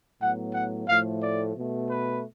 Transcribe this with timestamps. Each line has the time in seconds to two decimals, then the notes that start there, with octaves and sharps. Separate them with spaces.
0.21 A2 F#3 B3 F#5
0.54 F#5
0.88 A2 F3 A3 F5
1.22 D5
1.56 B2 A3
1.90 B4